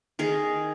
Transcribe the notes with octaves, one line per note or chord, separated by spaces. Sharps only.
D#3 G#4 A#4